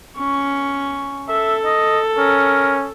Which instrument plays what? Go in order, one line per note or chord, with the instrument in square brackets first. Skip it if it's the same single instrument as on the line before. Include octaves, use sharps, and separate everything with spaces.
[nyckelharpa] C#4 C#6
[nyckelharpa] A4 [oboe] E5
[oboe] D#5
[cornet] C#4 [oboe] A#4